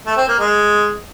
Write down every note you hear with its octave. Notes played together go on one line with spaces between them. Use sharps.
A3
C4
A#3
G#3